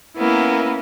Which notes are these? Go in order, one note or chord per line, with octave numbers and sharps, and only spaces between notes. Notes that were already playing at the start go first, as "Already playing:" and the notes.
A#3 B3 C#4 E4 A#4